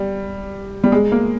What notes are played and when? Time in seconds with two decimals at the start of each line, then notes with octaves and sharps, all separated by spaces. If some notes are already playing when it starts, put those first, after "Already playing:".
Already playing: G3
0.84 G3
0.92 G#3
1.12 A#3